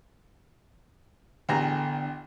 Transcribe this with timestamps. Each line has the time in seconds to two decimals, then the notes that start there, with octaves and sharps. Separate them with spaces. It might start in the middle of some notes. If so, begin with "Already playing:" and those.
1.49 A1 D3 B3 G#4 G5 A#5